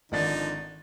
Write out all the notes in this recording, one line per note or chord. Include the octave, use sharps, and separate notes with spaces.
G#1 D3 F3 D#4 D5 A6